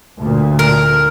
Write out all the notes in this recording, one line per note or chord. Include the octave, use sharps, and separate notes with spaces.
D2 A#2
A#4